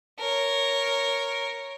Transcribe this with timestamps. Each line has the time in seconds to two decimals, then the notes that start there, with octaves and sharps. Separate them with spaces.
0.20 A#4 C#5